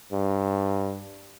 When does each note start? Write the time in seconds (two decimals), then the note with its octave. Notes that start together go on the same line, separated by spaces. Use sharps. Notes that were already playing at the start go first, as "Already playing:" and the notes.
0.12 G2